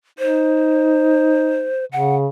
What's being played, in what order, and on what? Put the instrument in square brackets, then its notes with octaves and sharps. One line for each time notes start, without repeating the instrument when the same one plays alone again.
[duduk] D#4 [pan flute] C5
[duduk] C#3 [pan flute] F#5